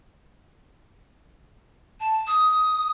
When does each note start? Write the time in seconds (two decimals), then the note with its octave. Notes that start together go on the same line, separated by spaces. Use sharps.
2.00 A5
2.27 D#6